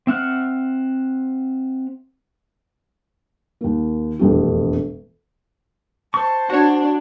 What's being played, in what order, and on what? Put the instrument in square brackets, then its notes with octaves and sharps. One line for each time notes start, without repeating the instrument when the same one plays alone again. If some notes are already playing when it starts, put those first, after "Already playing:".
[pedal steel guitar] C4 E5 F#5 F6
[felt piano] D#2 A#3
E1 A#1 F2 A2 G4
[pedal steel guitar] C5 C#6 [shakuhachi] A5
[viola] D4 [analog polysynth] F#4 C#5